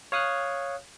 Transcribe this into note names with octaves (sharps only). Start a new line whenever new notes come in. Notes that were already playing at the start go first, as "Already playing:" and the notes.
C#5 F5 D#6 F6 F#6